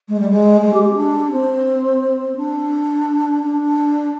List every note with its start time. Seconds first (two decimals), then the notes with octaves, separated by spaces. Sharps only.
0.08 G#3
0.20 G3
0.30 G#3
0.61 G#3
0.73 G4
0.84 G4
0.92 C4
0.96 D4
1.31 C4
2.37 D4
3.43 D4